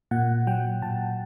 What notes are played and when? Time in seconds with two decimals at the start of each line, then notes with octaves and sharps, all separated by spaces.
0.11 A#2 F#5
0.47 F#3 G5
0.82 A#2 A5